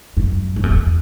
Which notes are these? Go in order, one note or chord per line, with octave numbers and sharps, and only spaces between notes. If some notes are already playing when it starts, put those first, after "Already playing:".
F#2
G2
F#2
E2